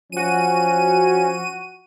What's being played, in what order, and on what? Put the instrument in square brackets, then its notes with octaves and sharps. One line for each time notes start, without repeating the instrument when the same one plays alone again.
[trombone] F3 [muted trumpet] C#4 [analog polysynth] F#4 D#7